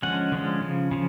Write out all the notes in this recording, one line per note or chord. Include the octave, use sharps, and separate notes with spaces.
D3 F3 G#3 C#4 F#5
D3 F3 G#3 C#4
C#3 F3
C#3 F3